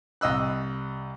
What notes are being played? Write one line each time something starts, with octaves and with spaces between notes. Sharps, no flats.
C2 D#5 E6 F#6